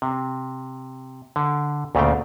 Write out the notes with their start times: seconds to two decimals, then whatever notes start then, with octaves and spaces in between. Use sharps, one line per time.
0.02 C3
1.36 D3
1.95 D2 A#2 C#3 A3 F5 G5